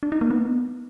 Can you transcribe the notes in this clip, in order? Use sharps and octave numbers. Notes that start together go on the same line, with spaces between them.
D4
D#4
A#3
B3